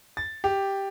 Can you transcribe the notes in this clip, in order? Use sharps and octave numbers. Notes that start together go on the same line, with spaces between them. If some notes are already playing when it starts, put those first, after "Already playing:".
A6
G4